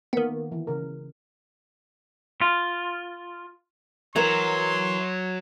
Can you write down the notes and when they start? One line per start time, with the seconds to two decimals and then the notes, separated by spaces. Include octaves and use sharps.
0.13 D#3 A#3 B3
0.52 E3
0.67 C#3 A#4
2.41 F4
4.16 E3 F#3 A#4 C6 G#6 E7